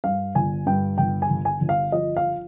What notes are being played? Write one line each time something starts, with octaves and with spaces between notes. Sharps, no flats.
G2 F5
G1 G#5
G2 G5
G1 G5
G#5
G1
G#5
G1
F5
F3 D#5
F5